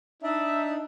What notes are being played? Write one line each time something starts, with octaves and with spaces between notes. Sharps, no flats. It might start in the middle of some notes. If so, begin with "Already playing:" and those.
D4 D#4 E5